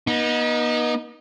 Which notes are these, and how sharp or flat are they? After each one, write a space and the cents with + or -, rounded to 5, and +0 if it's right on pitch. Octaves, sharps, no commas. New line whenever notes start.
B3 -40 D#4 +0